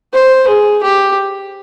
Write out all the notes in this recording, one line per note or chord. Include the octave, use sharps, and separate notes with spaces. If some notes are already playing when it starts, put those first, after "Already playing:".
C5
G#4
G4